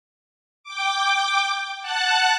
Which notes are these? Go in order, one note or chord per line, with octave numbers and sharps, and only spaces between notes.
G5 D6
F#5 A5 F#6